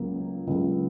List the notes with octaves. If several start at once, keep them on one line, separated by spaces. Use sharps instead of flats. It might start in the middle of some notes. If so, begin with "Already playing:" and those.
Already playing: C#2 C#3 F#3 A#3
C#2 C#3 F#3 A#3